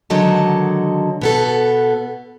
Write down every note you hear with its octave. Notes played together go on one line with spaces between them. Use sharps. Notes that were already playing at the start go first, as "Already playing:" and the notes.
D3 D#3 F#3 G#3 A5
B2 B3 A4